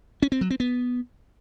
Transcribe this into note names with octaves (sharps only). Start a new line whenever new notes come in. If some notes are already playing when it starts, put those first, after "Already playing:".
C#4
C4
F#3
C4
B3